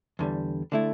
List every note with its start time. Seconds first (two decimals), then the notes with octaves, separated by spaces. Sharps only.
0.19 E2 D3 G3
0.72 D3 A3 E4